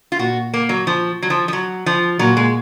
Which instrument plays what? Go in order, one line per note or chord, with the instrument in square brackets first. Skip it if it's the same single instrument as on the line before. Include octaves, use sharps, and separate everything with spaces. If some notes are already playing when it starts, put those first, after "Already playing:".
[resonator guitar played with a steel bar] F4
[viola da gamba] A#2 [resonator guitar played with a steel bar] F#4
[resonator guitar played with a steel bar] A#3
F#3
F3
F#3
F3
F3
F#3
F3
[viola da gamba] A#2 [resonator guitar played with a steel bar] F#3
[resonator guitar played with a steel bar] G#3